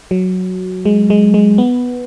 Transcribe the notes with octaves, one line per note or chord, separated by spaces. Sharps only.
F#3
G#3
G#3
G#3
B3